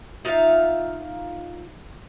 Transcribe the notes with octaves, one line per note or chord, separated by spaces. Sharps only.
D#4 F4 E5 F5